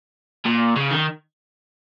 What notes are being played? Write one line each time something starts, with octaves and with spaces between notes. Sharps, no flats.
A#2
C#3
D#3